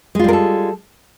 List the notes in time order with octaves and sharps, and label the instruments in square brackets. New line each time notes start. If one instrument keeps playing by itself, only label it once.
[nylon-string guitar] G#3
F4
G3
A#4
A4